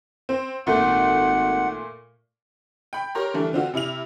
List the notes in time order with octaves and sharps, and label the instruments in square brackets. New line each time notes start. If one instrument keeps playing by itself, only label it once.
[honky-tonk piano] C4
[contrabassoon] G#1 [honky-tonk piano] A#2 A3 [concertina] F#5
[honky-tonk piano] G5 B5
G4 A#4 C#5 A#5 C6 F6
D3 E3 G3 A3 D4
D3 C4 F4 F#4
C3 E4 F6 F7